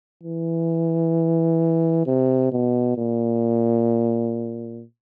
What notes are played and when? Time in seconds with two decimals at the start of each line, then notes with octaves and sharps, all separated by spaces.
0.23 E3
2.07 C3
2.52 B2
2.97 A#2